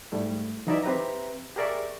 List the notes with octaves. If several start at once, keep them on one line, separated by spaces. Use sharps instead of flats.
G#2 G3 A3 E4
E3 F#3 D#4 E4 D5 E5
C4 G4 B4 E5 A#5
G4 G#4 A#4 D5 E5 C#6